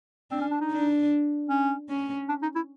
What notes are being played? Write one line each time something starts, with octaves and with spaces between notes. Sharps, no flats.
C4 D4
C#4
D4
D#4
D4
C#4
C#4
D4
D#4
E4